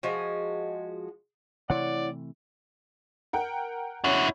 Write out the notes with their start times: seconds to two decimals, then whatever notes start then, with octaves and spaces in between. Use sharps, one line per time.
0.03 F3 G#3 F#4
1.70 C3 E3 A3 E4 C#5 D5 F#5
3.33 A#4 F#5 G5
4.04 C#4 E4 F#4